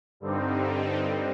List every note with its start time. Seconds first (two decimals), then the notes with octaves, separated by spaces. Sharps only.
0.20 G2 D3 G3 C4 D#4